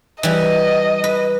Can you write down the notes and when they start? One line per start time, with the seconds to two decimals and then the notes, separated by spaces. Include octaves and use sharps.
0.23 E3 G3 D#5
1.04 B4